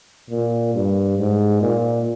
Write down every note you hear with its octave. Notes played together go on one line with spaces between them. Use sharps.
A#2
G2
G#2
A#2